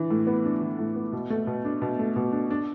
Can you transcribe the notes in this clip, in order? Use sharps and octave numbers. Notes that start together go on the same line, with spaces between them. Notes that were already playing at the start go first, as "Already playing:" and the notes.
Already playing: E3 D4
A2
B3
D4
E3
A2
B3
B2
A3
B2
D4
B2
A3
B2
D4
D4